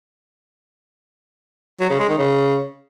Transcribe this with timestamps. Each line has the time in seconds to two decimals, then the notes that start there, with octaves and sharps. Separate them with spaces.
1.80 F#3
1.90 C#3
1.99 G#3
2.09 D#3
2.18 C#3